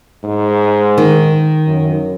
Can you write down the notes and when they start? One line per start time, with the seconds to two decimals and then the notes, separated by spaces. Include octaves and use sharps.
0.24 G#2
0.98 D#3
1.67 F#2